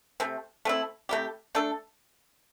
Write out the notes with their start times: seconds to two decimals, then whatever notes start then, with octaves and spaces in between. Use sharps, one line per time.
0.20 C3 A3 C4
0.65 A3 C4 E4
1.09 C3 A3 E4 G4
1.55 A3 D4 A4